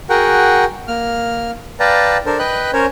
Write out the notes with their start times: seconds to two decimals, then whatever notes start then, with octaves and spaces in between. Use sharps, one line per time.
0.10 F#4 G#4 A#4 F#5 G5
0.88 A#3 F6
1.80 B4 D5 F5 G5 A5 A#5
2.26 D4 A4 A#4 C5
2.39 B4 D#5 G5 B5 F#6
2.73 C#4 A#4 C5 C#5